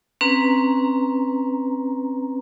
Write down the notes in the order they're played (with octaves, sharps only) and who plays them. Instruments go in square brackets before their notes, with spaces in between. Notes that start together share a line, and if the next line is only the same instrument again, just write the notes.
[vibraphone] C4 C#4 B4 A#5